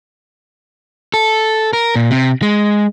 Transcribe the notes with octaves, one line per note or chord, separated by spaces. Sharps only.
A4
A#4
A#2
C3
G#3